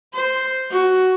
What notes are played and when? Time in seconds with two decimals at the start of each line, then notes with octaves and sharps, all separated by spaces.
0.14 C5
0.70 F#4